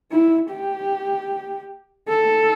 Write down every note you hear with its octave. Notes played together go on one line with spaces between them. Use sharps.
E4
G4
A4